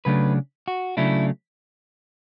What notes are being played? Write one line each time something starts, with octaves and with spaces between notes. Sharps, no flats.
C#3 F#3 A3 D4 B4
F#4
C#3 F#3 A3 D4 E4